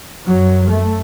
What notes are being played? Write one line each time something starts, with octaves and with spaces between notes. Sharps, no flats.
F#2 F#3
A3